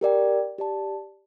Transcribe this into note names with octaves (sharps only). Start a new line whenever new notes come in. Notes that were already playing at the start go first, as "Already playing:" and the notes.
G4 A#4 D5 G5
G4 D5 A5